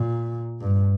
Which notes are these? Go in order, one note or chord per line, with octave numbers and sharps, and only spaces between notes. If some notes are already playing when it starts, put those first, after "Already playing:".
Already playing: A#2
G2